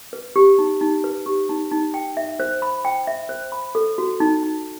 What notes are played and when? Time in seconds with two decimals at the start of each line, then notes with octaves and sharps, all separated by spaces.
0.13 B4
0.36 G4
0.59 D#4
0.81 D#4
1.04 B4
1.26 G4
1.49 D#4
1.71 D#4
1.94 G5
2.17 E5
2.40 C5
2.62 B5
2.85 G5
3.07 E5
3.29 C5
3.52 B5
3.75 A4
3.98 F#4
4.20 D#4
4.43 D#4